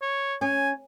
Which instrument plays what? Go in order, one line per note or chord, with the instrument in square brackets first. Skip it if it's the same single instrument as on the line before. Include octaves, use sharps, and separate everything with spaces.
[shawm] C#5
[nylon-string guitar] C#4 [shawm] G#5